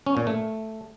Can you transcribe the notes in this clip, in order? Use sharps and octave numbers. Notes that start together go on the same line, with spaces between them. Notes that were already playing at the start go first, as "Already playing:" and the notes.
C#4
A#2
A3